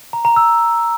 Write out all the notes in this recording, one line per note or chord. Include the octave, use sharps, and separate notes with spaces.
A#5
A#5
E6